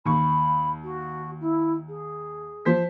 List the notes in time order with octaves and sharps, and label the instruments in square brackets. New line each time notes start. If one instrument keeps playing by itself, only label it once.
[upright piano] D#2 C#6 [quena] B5
[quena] F#4
E4
G#4
[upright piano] F3 C5 B6